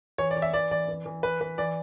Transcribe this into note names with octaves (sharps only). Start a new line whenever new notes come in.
E3 C#5
D5
E3
E5
E3 D5
E3 D5
E3
E3
E3 B4
E3 B4
E3 D5